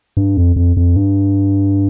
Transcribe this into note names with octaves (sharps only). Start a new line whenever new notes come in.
G2
F2
F2
F2
G2